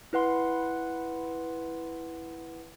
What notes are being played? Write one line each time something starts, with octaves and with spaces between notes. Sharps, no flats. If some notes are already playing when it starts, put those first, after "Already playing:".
E4 B4 F#5 C6